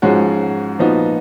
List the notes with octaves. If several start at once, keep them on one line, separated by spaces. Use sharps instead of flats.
G#2 F3 G#3 C#4 F#4
A#2 F3 B3 D#4 F#4